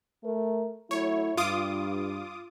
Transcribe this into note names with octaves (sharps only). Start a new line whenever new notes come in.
A3 A#4
F#3 A3 E4 C#5
G2 F4 D6 D#6